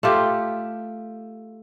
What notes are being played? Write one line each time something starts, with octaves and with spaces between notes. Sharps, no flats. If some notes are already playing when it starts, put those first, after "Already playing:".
A3 F4 G4